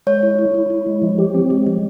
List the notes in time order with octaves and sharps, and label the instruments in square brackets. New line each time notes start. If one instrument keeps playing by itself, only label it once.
[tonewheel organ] G#3 [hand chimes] C#5
[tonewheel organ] E4
E4
E4
E4
G#3
F3
G4
C4
G#3
F3